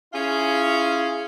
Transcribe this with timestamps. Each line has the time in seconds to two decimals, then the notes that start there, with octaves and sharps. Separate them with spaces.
0.13 C#4 E4 F4 G#4